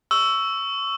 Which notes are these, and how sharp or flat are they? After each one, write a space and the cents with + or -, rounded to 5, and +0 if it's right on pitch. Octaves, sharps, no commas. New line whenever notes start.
C#6 +15 E6 +0